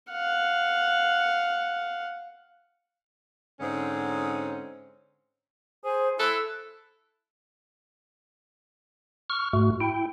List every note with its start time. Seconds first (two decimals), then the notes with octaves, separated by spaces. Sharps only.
0.11 F5 F#5
3.60 G#2 D3 C4 C#4 D#4
5.84 G#4 C5
6.19 E4 A4 F#6
9.30 C#6 F6
9.53 G#2 A3 F#4
9.81 E4 G5